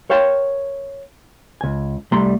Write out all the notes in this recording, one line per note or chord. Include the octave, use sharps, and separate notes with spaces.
A#4 C#5 F5 G5 A5 C6
C#2 G#5
C2 G3 A3 A#5 C6